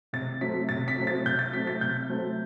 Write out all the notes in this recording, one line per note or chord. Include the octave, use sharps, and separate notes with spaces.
C3 A6
F#3 A3 C4 B6
C3 A6
B6
F#3 A3 C4
A6
C3 G6
A6
F#3 A3 C4 B6
A6
C3 G6
F#3 A3 C4